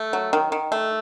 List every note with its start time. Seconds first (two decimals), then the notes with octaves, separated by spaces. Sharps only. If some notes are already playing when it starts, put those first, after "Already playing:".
Already playing: A3
0.13 F#3
0.33 D#3
0.52 D#3
0.72 A3